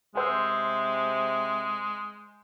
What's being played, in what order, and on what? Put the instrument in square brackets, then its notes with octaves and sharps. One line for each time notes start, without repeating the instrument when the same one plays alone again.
[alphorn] C3 [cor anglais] G#3 [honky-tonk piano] G#4 C5 E6